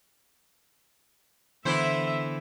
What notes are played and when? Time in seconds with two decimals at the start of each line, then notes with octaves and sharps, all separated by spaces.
1.65 D3 E3 B3 E4 C5 E5